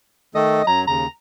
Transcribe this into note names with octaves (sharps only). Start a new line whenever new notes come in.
D#3 A3 A4 D#5
F#2 F#3 A#5
D#2 C#3 A#5